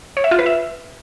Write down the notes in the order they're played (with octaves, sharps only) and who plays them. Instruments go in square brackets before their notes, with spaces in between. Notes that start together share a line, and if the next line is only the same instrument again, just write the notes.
[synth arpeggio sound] C#5
E5
F4
B4
E5